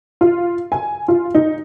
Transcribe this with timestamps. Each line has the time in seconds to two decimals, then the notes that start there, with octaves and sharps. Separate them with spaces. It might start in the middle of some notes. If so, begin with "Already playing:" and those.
0.21 F4
0.72 G#5
1.08 F4
1.35 D#4